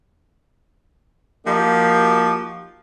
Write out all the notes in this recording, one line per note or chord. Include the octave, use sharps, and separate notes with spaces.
F3 A#3 D#4 F#4 G4